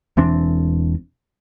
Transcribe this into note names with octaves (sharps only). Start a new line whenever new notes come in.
E1 E3 C4 D4